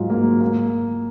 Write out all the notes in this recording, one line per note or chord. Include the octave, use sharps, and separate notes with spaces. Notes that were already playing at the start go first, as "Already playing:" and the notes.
Already playing: G#2 F#3 F4
A#3
A#3